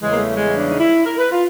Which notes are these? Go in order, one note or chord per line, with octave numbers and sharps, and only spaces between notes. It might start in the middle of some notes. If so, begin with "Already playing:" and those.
E2 C#3 E3 G3 G#3
A#3
A3
G#3
D4
D#4
E4
A#4
B4
F4